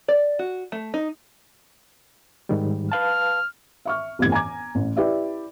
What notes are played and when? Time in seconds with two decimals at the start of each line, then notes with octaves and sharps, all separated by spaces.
0.08 D5
0.39 F#4
0.72 A3
0.94 D#4
2.49 G#2 D#3 G3
2.92 B4 F5 A5 F6
3.85 E5 C#6 F6
4.19 G1 F2 A2 E3 G4 G#6
4.32 G#5 A#5 D6 G#6
4.75 A1
4.96 E4 G4 B4 D5 E5